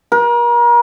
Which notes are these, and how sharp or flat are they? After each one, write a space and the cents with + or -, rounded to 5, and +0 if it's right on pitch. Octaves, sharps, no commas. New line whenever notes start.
A#4 +35